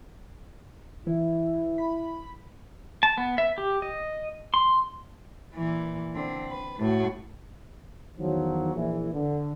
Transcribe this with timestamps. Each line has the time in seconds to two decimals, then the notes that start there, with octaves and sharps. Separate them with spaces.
1.07 E3 E4
1.78 B5
3.03 A5
3.18 B3
3.38 E5
3.58 G4
3.82 D#5
4.54 C6
5.55 A#2 E3
6.15 D3 C4
6.48 B4
6.79 A2 F#4
8.19 E2 D#3 F3 F#3
8.75 A#1 E3
9.13 D3